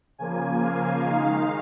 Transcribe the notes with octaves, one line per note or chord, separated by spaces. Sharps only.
C#3 F3 A#3 G#5
F5
D#3 G#3 D#4 F5